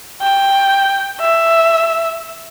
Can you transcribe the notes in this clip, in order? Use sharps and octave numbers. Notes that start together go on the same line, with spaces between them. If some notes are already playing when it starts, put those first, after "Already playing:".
G5
E5